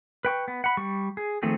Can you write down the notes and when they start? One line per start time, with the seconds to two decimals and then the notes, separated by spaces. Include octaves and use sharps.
0.25 B4 G5 C#6
0.48 B3
0.64 F#5 B5
0.77 G3 C#6
1.17 G#4
1.43 D#3 F3 A3 C4 G#4